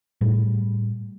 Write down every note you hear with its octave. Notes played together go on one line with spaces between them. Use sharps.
A2 G3